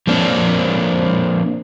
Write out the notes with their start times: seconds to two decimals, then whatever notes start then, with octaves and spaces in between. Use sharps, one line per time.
0.07 F3 A#3 C4 D4